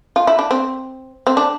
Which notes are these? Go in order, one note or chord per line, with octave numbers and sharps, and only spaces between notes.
F4
E4
D4
C4
C4
D4